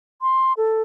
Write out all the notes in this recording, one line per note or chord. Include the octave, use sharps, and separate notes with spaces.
C6
A4